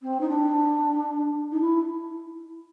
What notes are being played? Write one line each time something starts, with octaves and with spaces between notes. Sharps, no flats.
C4
D#4
D4
D#4
E4